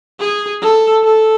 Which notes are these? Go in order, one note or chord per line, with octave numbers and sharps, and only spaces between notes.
G#4
A4
A4